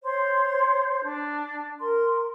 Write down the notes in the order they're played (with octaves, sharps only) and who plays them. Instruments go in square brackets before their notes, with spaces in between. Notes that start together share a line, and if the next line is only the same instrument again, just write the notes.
[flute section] C5 C#5 C6
D4
A#4 C6